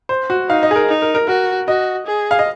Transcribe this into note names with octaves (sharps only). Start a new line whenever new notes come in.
C5
F#4
D#4 F5
D#5
G#4
A#4
D#4
A#4
A#4
F#4 A#4
F#4 D#5
G#4
F5
D#5